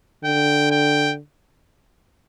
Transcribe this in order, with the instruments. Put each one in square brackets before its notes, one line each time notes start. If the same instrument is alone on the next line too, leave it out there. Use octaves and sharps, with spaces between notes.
[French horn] D3 [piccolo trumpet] G5
[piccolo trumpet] G5